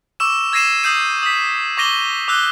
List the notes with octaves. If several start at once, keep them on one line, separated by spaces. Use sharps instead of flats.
C#6 D6 E6 E7
E6 G#6 A#6 C7 D#7 E7
D#6 E6 G6 C7 D#7
D#6 B6
C#6 D6 A#6 D#7 G7
D6 E6 F#6 G7